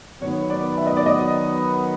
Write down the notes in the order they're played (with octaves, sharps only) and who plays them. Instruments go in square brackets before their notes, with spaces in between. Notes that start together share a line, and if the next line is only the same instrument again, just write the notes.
[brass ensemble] D#3 F#3 B3 [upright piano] C#5
[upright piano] D5
E5
D#5
D5
D#5